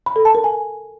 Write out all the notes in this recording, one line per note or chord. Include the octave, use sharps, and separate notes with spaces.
B5
A4
A5
A#4
G#5